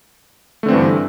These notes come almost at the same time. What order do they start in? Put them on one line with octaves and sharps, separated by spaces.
A3 D3 C4 E3 G2